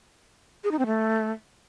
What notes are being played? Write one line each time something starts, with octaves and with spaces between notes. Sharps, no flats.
G#4
D#4
C4
A3